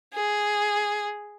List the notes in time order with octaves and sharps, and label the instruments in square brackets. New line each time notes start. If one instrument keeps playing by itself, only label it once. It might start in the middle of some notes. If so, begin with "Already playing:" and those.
[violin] G#4